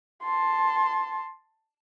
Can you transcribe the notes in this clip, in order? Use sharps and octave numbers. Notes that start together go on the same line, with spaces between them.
A5 C6